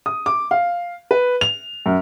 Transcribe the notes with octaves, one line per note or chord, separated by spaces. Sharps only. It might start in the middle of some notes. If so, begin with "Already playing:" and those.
D#6
D6
F5
B4
F7
F#2